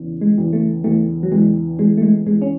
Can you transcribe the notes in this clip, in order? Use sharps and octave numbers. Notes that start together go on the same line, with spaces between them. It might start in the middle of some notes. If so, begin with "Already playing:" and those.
Already playing: E2 C#3 E3
G#3
E2
A3
E2 A3
F#3
E2 G#3
E2 G#3
A3
G#3
E2 G#3
C#4